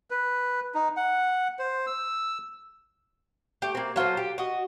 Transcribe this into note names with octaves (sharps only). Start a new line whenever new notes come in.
B4
D#4
F#5
C5
E6
A3 G4
A#3 C4
F#3 F4 A4 C5
G4
F#4 D#5